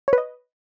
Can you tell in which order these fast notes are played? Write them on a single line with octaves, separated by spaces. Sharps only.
C#5 B4 D#5